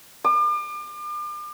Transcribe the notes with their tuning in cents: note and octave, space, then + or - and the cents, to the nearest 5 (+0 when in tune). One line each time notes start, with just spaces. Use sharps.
D6 +40